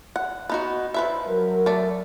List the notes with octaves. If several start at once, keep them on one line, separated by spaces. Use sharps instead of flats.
F#5
B3 D#4 F#4
F3 B4 E5
F#3 A#4
A3 D5